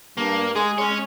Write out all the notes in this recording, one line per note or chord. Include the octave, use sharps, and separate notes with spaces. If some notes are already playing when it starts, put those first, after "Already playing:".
G2 A#3
G#3 G#4
G#3 C#4 C#5